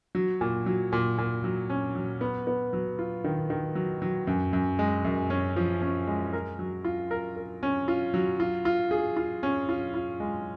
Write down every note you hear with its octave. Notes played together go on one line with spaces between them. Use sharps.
F#3
A#2
F#3
A#2
A#2
F#3
C#4
F#3
B3
B3
F#3
F4
D#3
D#3
F#3
F#3
F#2
F#2
G#3
F#2
C#4
F3
C#4
G#3
A#4
F#3
F4
A#4
A#4
C#4
F4
F#3
F4
F4
G#4
F4
C#4
F4
F4
G#3